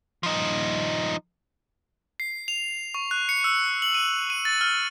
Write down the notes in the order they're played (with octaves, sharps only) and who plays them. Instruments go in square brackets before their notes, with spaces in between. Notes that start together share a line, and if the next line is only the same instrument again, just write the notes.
[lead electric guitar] F3 D#4
[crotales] C7
F7
C#6
F#6
C#7
E6
F#7
D#7
D#7
A6
F6